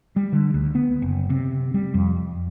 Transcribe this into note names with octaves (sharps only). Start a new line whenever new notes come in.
G3
D3
D2
B3
F#1
C3
G3
F2